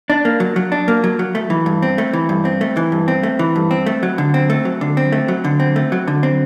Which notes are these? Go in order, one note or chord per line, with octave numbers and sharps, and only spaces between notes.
D4
A#3
F#3
F#3
D4
A#3
F#3
F#3
A3
E3
G2
C4
A3
E3
G2
C4
A3
E3
G2
C4
A3
E3
G2
C4
A3
F#3
D3
C4
A3
F#3
D3
C4
A3
F#3
D3
C4
A3
F#3
D3
C4